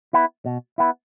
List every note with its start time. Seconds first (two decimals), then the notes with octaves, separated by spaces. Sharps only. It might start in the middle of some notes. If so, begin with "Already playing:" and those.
0.13 B3 E4
0.46 B2
0.78 B3 E4